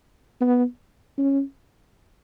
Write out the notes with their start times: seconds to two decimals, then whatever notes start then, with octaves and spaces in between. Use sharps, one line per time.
0.41 B3
1.18 C#4